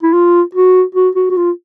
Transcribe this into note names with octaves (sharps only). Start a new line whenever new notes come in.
E4
F4
F#4
F#4
F#4
F#4
F4